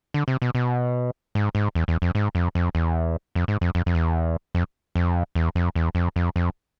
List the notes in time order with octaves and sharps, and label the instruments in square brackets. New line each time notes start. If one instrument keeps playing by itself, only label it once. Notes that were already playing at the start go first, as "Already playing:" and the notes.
[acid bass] D3
C3
B2
B2
G#2
G#2
E2
E2
F2
G#2
F2
F2
E2
F2
G#2
F2
F2
F2
E2
F2
F2
E2
F2
E2
F2
F2
F2